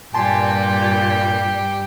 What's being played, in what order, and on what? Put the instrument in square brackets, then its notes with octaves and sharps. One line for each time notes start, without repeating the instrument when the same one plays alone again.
[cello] G2 G3 [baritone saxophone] A#2 [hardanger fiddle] G4 [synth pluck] G#5 A5 C6